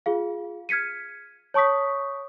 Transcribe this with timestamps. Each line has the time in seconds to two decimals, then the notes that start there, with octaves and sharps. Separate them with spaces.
0.06 F4 G#4 F5
0.69 F6 G#6 B6 C#7 D#7
1.54 C#5 A5 C#6 D#6 B6